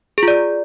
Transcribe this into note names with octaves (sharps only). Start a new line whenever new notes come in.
F4 G#4 D5